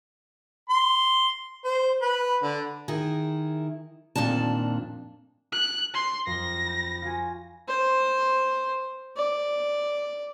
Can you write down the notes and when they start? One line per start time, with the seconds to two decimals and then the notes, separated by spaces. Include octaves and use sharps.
0.70 C6
1.65 C5
2.02 B4
2.43 D3
2.88 D#3 E4 G#4
4.15 F2 A#2 D#3 D4 A5
5.53 F#6 D7
5.94 C6
6.27 F2 A#6
6.66 B5 G6
7.02 F4 F#4 G#5
7.68 C5
9.16 D5